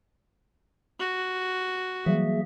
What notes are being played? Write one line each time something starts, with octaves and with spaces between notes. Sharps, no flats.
F#4
E3 F#3 G3 A#3 G#4 E5